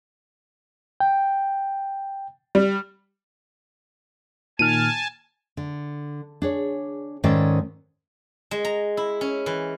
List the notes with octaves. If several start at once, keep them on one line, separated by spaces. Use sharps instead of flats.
G5
G3
A#2 D#3 G#5 A5 F6 D#7
D3
D4 G#4 C#5
G#2 D#3 C#4 A4 C5 D5
G#3
A#5
E4
C#4
E3